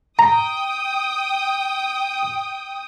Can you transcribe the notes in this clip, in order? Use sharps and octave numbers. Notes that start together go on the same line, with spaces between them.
G5 A#5 D#6